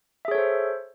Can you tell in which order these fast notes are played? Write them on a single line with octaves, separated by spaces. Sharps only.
E5 G#4 C#5 A4 C5